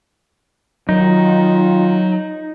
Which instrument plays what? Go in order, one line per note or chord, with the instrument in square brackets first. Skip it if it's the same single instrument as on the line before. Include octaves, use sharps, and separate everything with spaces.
[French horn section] D#3 F4 [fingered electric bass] F#3 [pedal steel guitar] D#4